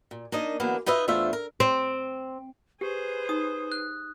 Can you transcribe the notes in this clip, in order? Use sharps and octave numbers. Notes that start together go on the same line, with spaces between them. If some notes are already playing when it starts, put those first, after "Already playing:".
A#2
A#3 D4 D#4 D#5
D3 E3 F#3 A#3 B3
D#4 F4 B4 D#5 E5
E2 A3 D4 F4 C5 E5
A#4
C4
G4 G#4 B4 C5
D#4 D#6
F#6